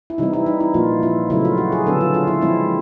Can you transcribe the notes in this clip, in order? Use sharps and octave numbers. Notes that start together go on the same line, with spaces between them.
E4
C3 E3 G3 C4 D#4
E4
D#4
E4
A#2 F3 A#3 F4
E4
C#3 F#3 A3 C4 E4
F4
F#4
G#4
D3 F#3 B3 D4 A4
F4
F4
E4
F3 G#3 C4 E4